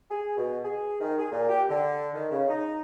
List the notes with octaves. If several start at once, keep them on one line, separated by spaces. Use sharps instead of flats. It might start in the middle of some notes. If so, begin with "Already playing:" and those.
G#4
B2
G#4
D#3
G#4
A#2
G4
D3
D#3
C#3
D#4